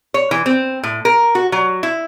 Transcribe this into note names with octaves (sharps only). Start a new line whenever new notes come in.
C#5
E3
C4
A2
A#4
F#4
F#3
E4